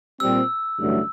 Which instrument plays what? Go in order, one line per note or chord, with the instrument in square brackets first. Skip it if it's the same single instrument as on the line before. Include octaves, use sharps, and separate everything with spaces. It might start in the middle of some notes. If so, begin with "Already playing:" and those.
[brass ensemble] A#2 G3 C4 [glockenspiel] E6
[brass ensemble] A1 G2 D3 F#3 A3